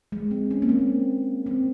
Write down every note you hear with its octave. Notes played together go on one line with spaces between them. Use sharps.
G#3
C4
C#4
A#3
C4
C4